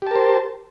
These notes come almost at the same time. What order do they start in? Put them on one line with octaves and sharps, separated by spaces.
G4 A5 A#4 C5